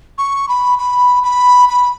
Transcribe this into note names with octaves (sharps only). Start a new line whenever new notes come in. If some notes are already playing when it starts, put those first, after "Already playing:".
C#6
B5
B5
B5
B5